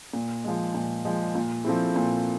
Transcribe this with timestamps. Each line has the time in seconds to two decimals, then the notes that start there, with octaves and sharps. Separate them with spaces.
0.13 A#2
0.44 F3 G#3
0.75 A#2
1.05 F3 G#3
1.35 A#2
1.65 F3 A3 C4 E4
1.96 A#2